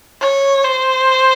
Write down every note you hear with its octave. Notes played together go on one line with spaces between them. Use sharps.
C#5
C5